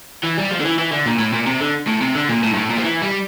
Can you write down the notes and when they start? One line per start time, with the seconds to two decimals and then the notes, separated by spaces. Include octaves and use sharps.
0.23 E3
0.38 G3
0.51 F3
0.60 D3
0.65 E3
0.79 E3
0.92 D3
1.06 A#2
1.19 A2
1.33 A#2
1.47 C3
1.60 D3
1.88 A2
2.02 C3
2.15 D3
2.29 A#2
2.43 A2
2.51 G2
2.56 A2
2.70 A#2
2.77 F3
2.84 E3
3.02 G3